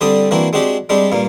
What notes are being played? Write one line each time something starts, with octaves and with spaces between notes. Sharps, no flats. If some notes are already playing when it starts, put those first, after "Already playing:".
D3 G3 C4 D4 D#6
E3 A#3 C4 D4 F#4
G#3 C4 D4 F#4 G4
G3 G#3 C4 D4 G4
G2 A#2 A#3